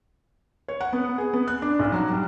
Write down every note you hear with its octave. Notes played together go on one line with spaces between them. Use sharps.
C#5
F#5
B3
G#4
B3
F#6
D4
B1
F#3
G3